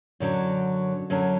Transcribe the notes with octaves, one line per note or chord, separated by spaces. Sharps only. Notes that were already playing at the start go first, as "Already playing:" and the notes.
F#2 D3 F#3
F#2 D3 F#3